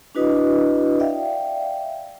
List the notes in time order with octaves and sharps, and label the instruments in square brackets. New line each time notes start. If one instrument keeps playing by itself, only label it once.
[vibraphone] D4 E4 F#4 B4 D#5 D#6
D5 E5 F5 G5